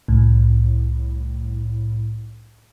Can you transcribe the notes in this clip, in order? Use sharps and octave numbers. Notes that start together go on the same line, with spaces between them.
C2 A2